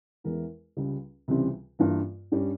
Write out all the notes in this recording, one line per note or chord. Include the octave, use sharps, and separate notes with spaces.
E2 E3 G#3 E4 A#4
C#2 C#3 G3
C#2 C3 E3 G3 C4
G2 E3 A#3 F4 A#4
G2 G3 C#4